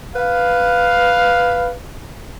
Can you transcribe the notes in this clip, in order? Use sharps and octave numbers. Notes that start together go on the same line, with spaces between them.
B4 F5